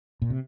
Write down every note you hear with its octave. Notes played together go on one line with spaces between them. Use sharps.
A#2
C3